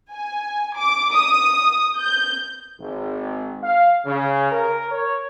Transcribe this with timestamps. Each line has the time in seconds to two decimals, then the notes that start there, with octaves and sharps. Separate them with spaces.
0.12 G#5
0.77 D6
1.13 D#6
1.98 G6
2.80 G#1
3.63 F5
4.05 C#3
4.52 A#4
4.92 C#5